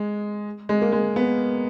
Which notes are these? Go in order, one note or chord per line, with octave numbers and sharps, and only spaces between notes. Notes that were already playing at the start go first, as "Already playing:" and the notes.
Already playing: G#3
G#3
A#3
G#3
B3